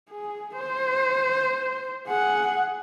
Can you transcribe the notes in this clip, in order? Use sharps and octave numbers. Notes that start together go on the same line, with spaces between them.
G#4
C5
G#4 F#5